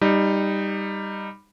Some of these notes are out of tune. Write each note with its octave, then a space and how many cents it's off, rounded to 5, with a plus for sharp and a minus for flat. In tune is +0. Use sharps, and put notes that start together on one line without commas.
G3 +10 D#4 -5